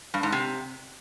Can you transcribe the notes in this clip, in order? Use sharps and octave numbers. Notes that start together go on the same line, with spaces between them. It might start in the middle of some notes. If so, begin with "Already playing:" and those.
G2
G#2
C3